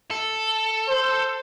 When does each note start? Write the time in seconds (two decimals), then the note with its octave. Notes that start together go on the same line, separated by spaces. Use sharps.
0.11 A4
0.88 C5